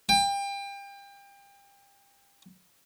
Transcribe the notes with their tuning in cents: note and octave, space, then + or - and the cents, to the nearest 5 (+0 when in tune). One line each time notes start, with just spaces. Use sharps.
G5 +30